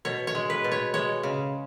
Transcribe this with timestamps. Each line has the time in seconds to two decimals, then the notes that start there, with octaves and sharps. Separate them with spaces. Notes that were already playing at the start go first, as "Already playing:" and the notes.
0.05 B2 C#5
0.27 C#5
0.35 G#3
0.50 B4
0.64 B2
0.72 C#5
0.94 G#3 C#5
1.23 C#3